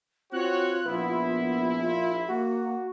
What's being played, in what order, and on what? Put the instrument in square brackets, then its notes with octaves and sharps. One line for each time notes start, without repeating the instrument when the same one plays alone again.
[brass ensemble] C4 F#4 C#5 [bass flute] F4 [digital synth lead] F#6
[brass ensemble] A#1 E4 [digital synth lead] B3
[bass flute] F4
[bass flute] A#3 [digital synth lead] F#4